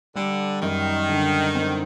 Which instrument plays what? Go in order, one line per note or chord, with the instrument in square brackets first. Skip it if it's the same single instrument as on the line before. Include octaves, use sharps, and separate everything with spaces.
[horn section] D3 [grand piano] G3
[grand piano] F#2 [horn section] D#3
[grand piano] D3
C4